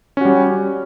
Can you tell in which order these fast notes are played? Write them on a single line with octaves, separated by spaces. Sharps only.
C#4 F#4 G3